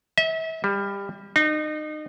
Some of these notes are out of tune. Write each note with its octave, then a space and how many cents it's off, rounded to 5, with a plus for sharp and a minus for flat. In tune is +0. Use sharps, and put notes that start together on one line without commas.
E5 -35
G3 +25
D#4 -30